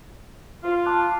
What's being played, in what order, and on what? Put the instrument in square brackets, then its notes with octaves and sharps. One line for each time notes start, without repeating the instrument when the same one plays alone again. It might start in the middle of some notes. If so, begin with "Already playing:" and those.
[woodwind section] F4
[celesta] A5 D6 F#6